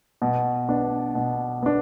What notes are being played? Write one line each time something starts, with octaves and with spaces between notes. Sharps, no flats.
B2
B3 D4
B2
B3 D4